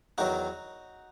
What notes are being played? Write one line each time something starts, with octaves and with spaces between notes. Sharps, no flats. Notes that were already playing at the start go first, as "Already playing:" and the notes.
E2 D#3 F#3 D#4 F#4